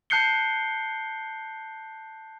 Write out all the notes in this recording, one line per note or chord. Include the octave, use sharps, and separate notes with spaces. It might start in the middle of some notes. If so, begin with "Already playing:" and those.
A5 F#6 G6 C7 C#7 G7